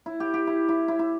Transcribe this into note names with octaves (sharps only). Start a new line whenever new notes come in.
E4
G4
G4
E4
E4
E4
E4